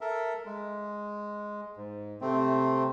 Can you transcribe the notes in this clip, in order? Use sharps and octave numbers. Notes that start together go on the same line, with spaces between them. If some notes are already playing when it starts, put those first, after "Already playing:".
A4 A#4 E5
G#3
G#2
C3 A3 C4